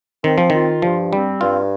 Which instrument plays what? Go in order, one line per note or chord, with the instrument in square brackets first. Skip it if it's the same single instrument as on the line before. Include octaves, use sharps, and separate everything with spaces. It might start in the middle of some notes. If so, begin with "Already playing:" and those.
[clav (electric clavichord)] D#3 [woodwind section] C4
[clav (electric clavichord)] F3
[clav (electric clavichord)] D#3 [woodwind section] F4
[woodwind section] G2 [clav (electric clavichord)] F3
[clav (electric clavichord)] G3 [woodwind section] C4
[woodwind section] G2 [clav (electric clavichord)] F4